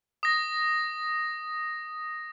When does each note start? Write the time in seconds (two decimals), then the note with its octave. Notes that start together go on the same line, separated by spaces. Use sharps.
0.23 D#6 A#6